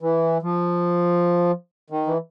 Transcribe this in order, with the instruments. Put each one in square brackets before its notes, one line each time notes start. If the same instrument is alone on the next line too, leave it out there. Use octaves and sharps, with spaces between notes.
[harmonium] E3
F3
D#3
E3